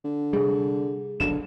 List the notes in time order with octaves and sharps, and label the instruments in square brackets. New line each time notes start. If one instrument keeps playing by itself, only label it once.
[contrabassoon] D3
[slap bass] C3 G3 [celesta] G#4
[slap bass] F#1 B1 B2 [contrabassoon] D3 [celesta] E7